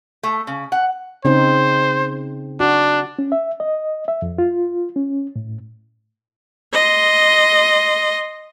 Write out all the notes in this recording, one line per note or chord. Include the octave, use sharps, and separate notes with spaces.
A3
C#3
F#5
C#3 C4 D#4 C5
D4 F#4
C#4
E5
D#5
E5
F2
F4
C#4
A2
D#5 C6